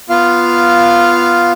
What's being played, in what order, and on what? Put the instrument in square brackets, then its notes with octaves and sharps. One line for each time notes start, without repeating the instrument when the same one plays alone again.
[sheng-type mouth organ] B3 F4 F5